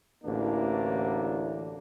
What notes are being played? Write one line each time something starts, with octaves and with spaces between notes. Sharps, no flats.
A1 D2 E3 A#3 D4